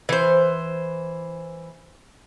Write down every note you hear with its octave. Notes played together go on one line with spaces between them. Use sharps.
E3 C5